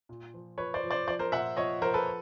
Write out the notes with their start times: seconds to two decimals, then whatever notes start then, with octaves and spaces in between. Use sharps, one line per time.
0.09 A#2
0.34 F3
0.58 F3 B4 C#5
0.74 C5 D5
0.83 F3
0.91 C5 D5
1.07 F3 C5 D5
1.19 A#4 C5
1.32 A#2 E5 F#5
1.57 F3 C#5 D#5
1.82 F3 A#4 C5
1.94 A4 B4